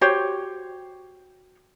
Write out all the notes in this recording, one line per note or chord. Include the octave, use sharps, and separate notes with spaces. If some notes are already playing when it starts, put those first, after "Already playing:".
F#4 G4 C5 C#5